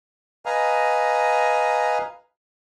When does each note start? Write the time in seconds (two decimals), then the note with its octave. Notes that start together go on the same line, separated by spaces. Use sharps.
0.46 B4 D#5 F5 G#5 A#5